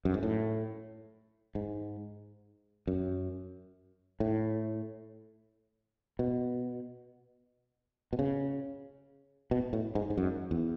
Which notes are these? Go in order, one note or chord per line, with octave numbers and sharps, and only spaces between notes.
F#2
G#2
A2
G#2
F#2
A2
B2
B2
C#3
B2
A2
G#2
G#2
F#2
E2